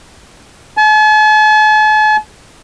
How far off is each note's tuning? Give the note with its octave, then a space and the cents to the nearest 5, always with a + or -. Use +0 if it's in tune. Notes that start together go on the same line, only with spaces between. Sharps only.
A5 -45